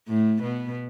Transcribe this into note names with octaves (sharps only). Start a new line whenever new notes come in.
A2 A3
B2 B3